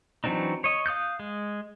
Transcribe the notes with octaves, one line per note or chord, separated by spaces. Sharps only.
E3 F#3 C4 D4 D#4
C#5 D#5
F5 D#6 F#6 G6
G#3